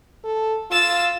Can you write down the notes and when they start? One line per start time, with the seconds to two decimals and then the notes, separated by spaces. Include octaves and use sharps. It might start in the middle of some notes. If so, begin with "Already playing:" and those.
0.24 A4
0.71 F4 E6 A6